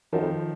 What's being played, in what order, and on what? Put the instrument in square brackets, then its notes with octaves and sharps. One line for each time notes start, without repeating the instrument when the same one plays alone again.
[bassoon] F#2 [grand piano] D#3 F3
[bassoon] F2